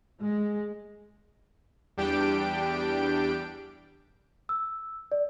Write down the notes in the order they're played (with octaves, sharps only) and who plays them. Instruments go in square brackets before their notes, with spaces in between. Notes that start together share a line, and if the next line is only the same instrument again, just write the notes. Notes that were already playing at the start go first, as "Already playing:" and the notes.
[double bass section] G#3
[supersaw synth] E2 G3 D4 G4 G5 D7
[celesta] E6
D5